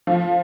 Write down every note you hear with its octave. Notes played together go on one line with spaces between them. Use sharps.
F3